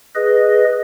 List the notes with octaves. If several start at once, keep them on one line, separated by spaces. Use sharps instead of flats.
G#4 B4 D#5